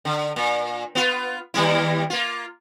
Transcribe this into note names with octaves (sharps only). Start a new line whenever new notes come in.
D3
A#2
B3 F4
D#2 G3 E4
A#3 F4